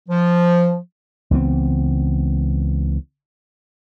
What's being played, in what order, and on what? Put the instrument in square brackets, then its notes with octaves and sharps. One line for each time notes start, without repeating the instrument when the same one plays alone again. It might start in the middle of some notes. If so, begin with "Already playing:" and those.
[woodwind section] F3
[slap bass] C#2 E3 B3 C4